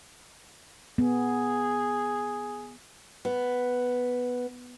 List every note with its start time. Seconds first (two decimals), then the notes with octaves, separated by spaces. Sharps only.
0.98 B3 G#4
3.25 B3